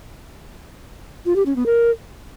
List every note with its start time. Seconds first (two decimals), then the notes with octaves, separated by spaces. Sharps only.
1.26 F4
1.36 G4
1.46 C#4
1.56 B3
1.66 A#4